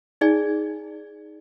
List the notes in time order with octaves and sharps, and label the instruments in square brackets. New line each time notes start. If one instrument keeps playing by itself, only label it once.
[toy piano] D#4 G#4 D5 G#5